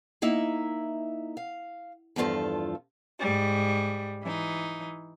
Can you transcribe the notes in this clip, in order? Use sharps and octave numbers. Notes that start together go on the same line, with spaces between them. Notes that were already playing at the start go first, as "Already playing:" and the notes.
A#3 D#4 E4 E5
F5
E2 G2 F3 F4 A4
G#2 G3
E3 D#4